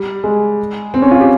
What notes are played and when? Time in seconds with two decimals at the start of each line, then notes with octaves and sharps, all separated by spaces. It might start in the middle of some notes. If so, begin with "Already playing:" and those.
Already playing: G3
0.24 G#3
0.94 C4
1.02 C#4
1.11 F4
1.21 G4